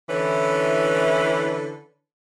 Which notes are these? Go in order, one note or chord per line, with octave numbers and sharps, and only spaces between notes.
D3 E3 C#4 E4 B4